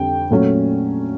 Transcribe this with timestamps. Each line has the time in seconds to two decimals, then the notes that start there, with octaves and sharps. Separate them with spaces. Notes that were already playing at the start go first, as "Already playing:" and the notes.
Already playing: F2 D3 G3 C4 G5
0.30 A#2 F#3 A3 C#4